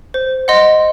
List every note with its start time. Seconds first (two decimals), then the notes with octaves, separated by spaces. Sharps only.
0.14 C5
0.48 D#5 F#5 C6